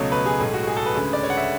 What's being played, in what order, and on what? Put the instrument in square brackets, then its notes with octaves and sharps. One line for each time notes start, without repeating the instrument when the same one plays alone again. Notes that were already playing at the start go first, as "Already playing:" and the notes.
Already playing: [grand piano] C#2 B2 F#3 A3 C#5
B4
G#4
B1 A2 G#3
F#4
G#4
A4
B4
D2 C#3 G#3
D5
C#5
F#5
E5